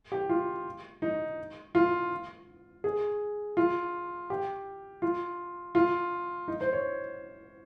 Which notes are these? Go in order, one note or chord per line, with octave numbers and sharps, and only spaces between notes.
G4
F4
D#4
F4
G#4
F4
G4
F4
F4
D#4
C5
C#5